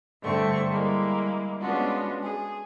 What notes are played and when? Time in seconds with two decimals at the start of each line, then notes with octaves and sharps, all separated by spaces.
0.22 G2 D3 A3 C4 C#6
0.68 G3 G#3 A#3 E4
1.61 G#3 B3 C#4 D4 F4 F#4
2.22 G#4